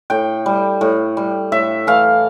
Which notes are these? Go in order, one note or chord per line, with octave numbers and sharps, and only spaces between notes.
A2 G5
G3
A2
G3
A2 E5
E3 A3 F5